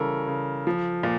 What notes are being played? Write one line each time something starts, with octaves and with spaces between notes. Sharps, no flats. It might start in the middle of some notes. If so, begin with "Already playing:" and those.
Already playing: C#3 E3 G3 A4 A#4
C#3
F3
A#2